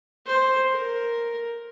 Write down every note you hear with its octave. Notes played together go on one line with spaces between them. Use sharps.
C5
A#4